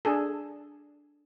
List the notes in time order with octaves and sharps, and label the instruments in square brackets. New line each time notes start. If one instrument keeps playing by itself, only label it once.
[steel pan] D4 G#4 A4